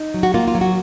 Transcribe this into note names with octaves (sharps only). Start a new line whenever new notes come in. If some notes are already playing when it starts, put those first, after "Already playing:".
Already playing: D#4
F#3
F#4
A#3 F4
F4
F#3
F#4